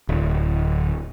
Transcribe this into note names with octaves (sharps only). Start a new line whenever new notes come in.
D1